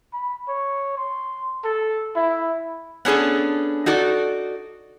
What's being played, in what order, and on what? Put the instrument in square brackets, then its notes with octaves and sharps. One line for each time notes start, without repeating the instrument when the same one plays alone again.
[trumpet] B5
C#5
C6
A4
E4
[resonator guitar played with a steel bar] B3 C#4 D4 G#4 A4
D#4 F#4 A4 D5